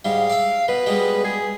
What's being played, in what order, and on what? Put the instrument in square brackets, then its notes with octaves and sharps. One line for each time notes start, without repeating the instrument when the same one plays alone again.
[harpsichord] G#2 G3 [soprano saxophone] F5
[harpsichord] D5 E5
[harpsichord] B2 [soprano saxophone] B4
[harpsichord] B2 G3 G#3
[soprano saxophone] G#4